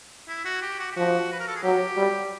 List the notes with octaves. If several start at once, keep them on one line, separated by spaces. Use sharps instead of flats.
E4
F#4
G4
F#4
G4
F3 F#4
B4
A#4
A4
G#4
F#3 G4
G3